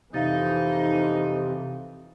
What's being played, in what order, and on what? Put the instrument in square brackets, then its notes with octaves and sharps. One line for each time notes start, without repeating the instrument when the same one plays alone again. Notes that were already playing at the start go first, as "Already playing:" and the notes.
[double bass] F2 E3 [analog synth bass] C3 [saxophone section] D#4 [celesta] E5 F5 A6